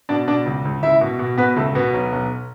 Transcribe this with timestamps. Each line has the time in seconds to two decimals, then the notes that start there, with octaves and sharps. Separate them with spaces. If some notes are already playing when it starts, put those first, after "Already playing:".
0.09 B2 D4 D5
0.28 B2 D4 D5
0.46 C#2
0.65 C#2
0.83 C#2 E4 E5
1.01 B2
1.19 B2
1.38 B2 B3 B4
1.56 C#2 A3 A4
1.75 B2 B3 B4
1.94 B1
2.12 B1